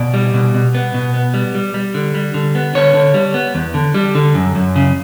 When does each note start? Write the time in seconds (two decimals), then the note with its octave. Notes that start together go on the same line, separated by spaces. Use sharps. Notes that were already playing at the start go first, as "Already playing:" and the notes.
Already playing: B2 D5
0.14 G3
0.34 B2
0.55 B2
0.75 B3
0.94 B2
1.14 B3
1.34 G3
1.55 G3
1.74 G3
1.94 D3
2.15 G3
2.34 D3
2.55 B3
2.75 D3 C#5
2.94 D3
3.14 G3
3.34 B3
3.55 E2
3.74 D3
3.94 G3
4.15 D3
4.34 F#2
4.56 F#2
4.76 C#3